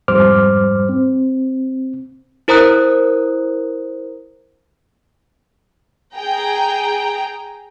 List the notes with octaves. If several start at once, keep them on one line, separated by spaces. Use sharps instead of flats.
F2 G#2 G3 C5 D6 F6
C4
E4 A#4 C5 A#5 D#6 F#6
G#4 G5 A#5